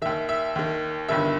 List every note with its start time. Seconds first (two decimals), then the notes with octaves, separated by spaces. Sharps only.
0.02 D#3 E5
0.05 D#2
0.29 E5
0.55 D#2 D#3
1.09 G1 G2 D#3 E5